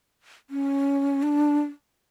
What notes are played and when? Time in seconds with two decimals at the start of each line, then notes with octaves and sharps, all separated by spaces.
0.50 C#4
1.23 D4